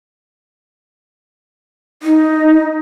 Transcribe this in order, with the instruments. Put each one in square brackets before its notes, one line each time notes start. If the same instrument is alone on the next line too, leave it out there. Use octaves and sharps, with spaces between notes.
[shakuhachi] D#4